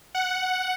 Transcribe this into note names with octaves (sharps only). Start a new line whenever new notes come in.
F#5